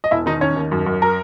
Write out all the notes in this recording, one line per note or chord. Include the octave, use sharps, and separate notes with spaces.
D#5
E1 E4 E5
D#3 D#4 D#5
D#3 C#4 C#5
D#2
F#2
F#2
A#4